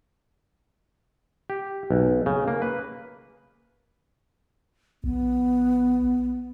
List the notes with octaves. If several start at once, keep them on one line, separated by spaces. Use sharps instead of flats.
G4
B1
C#3
A#3
B4
A#1 B3